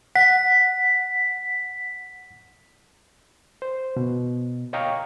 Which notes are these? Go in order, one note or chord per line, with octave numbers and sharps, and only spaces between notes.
F#5 B6
C5
B2
C#5 D#5 F5 G5 A#5 C#6